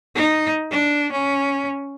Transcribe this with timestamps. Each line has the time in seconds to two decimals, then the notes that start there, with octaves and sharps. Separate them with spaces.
0.15 D#4
0.71 D4
1.12 C#4